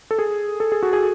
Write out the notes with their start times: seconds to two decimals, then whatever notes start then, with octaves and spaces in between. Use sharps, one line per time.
0.11 A4
0.19 G#4
0.60 A4
0.72 G#4
0.83 F#4
0.93 G#4